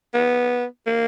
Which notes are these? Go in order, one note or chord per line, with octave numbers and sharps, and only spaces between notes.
B3
A#3